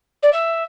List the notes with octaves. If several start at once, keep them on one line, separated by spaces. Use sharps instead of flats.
D5
E5